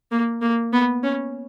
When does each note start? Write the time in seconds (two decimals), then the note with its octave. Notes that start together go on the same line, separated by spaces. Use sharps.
0.11 A#3
0.41 A#3
0.73 B3
1.03 C#4